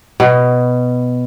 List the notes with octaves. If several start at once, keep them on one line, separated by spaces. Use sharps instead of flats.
B2